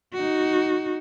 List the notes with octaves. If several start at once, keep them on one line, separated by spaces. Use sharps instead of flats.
D#4 F#4